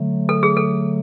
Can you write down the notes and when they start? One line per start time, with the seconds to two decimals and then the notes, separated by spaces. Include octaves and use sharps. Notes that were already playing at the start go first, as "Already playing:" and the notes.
Already playing: D3 F#3 A3
0.29 A4
0.43 G#4
0.57 A4